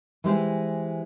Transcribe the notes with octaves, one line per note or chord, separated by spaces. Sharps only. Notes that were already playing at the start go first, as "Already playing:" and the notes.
E3 G#3 G4 C5